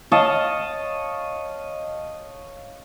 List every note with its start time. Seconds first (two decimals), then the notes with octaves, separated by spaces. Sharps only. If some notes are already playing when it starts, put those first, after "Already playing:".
0.12 C#5 D#5 F5 A5